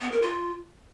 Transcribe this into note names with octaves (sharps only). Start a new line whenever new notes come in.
B3
A#4
F4